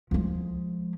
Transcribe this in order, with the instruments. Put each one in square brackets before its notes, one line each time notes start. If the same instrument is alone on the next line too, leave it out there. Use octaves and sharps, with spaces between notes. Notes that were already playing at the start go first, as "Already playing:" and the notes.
[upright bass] F3 G#3